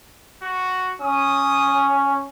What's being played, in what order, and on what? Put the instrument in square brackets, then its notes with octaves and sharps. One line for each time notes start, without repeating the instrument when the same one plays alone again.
[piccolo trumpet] F#4
[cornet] C#4 [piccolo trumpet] D#6